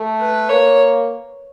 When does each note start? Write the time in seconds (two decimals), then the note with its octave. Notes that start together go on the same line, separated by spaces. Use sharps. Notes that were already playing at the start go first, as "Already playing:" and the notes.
Already playing: A3
0.21 B4
0.49 A#3 C#5